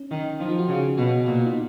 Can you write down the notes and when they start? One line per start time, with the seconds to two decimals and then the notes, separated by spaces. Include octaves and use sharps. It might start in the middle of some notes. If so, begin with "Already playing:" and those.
Already playing: C#4
0.11 D#3 D#4
0.40 F3 D#4
0.50 F4
0.59 F#4
0.69 C#3
0.97 B2 F#4
1.26 A#2 F#4
1.36 F4
1.46 D#4